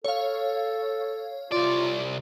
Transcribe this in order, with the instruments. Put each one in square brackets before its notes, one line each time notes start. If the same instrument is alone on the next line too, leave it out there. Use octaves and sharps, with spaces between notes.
[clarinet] A4 [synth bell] C#5 F5
[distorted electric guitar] C2 D5 [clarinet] F4